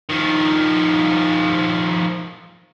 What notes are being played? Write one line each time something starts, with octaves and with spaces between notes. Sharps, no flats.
D#3 F3